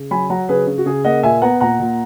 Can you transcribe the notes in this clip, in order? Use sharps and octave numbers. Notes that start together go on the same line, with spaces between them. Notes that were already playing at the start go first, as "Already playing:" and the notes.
Already playing: C#3
F#3 G#5 B5
F#3 F#5 A#5
C#3 G#4 B4
C#3
F#4
C#3 G#4
A#3 D#5 F#5
A#2 E5 G#5
B3 F#5 A#5
A#2 F#5 A#5
A#2